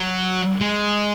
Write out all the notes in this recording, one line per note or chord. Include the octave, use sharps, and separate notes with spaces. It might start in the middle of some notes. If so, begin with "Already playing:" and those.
Already playing: F#3
G#3